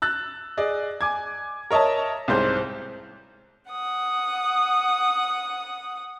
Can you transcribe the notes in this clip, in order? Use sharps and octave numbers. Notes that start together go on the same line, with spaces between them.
E6 F#6 A6
G#4 D5 D#5
G#5 D6 G#6
A#4 C#5 D#5 E5 A5
C2 G#2 C5 G6
F#5 D#6